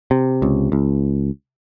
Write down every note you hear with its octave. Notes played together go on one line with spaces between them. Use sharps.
C3
C#2
C#2